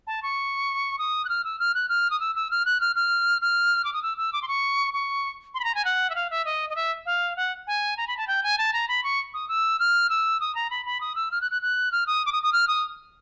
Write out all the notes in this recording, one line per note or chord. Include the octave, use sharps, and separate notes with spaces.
A5
C#6
D#6
F#6
F6
E6
F6
F#6
F6
D#6
E6
E6
F6
F#6
F6
F6
F6
D6
D#6
E6
E6
D6
C6
C#6
C#6
C6
B5
A#5
G#5
F#5
E5
F5
E5
D#5
D#5
E5
F5
F#5
G#5
A#5
B5
A5
G5
G#5
A5
A#5
B5
C#6
D#6
E6
F6
E6
D#6
A#5
B5
B5
D#6
E6
F6
F#6
F#6
F#6
F6
D#6
D6
D#6
D#6
F6
D#6